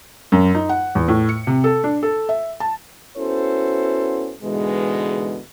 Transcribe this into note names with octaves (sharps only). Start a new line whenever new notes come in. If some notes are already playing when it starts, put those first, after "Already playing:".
F#2
D#4
F#5
E2
A2
C#7
C3
A4
D4
A4
E5
A5
B3 C#4 E4 F#4 A4 C5
G#2 B2 D3 E3 G#3